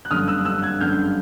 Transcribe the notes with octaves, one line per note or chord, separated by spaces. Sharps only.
F#6
G1 F#2 D3 D#6 F6
E6 F#6
E6 F#6
F#6 G#6
G1 F#2 D3 F6 G6